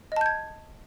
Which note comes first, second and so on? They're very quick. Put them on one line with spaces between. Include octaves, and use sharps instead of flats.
D#5 A5 G6 G#6